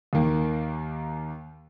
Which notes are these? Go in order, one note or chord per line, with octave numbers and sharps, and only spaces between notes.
D#2 D#3 A#3